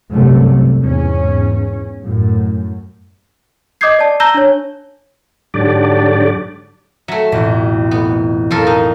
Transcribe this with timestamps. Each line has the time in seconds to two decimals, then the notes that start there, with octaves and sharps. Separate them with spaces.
0.12 G1 C2 F#2 C3 G3 A3
0.81 E2 G#2 C#4
2.02 F#2 A2
3.81 D#5 D6 D#6 G6 G#6 C7
3.99 D5 A5
4.20 A5 A#5 E6 G6 A#6 G7
4.34 D4 C#5
5.54 G#2 D3 F#3 D4 G4 D5
7.08 F#3 A3 E5
7.32 A1 F2 B2
7.91 B3
8.51 F2 F3 A4 A#4
8.67 D#4